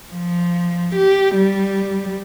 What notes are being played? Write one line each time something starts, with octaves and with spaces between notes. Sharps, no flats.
F3
G4
G3